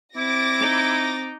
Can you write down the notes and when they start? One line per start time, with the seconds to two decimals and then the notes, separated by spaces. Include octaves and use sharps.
0.16 C4 E4 D6 A6 A#6
0.61 D#4